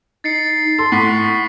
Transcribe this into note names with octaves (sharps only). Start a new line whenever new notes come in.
D#4 A6 C7 C#7
A4 C6
A2 F#5 C#6 B6